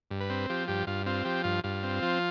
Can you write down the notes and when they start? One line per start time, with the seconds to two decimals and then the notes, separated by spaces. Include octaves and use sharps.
0.11 G2
0.21 B4
0.30 C4
0.50 F3 G4
0.68 G2 G4
0.87 G2 F4
1.06 C4 F4
1.25 F3 G4
1.44 G2 F4
1.64 G2 F4
1.83 C4
2.02 F3